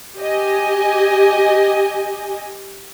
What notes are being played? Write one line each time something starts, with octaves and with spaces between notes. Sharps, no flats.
G4 D#5 G#5